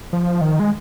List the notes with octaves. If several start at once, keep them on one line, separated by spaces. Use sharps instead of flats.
F3
D#3
G#3